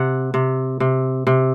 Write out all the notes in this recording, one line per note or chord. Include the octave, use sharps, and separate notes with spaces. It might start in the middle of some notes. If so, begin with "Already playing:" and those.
Already playing: C3 F#5
C3
C3
C3